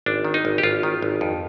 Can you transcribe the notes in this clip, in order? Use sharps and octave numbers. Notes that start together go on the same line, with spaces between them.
G#1 D4
D#3
D#4
G#1
G4
G#1 F4
D#3
G#1
F2